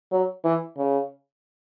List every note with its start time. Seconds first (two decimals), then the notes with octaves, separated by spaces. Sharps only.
0.12 F#3
0.45 E3
0.78 C#3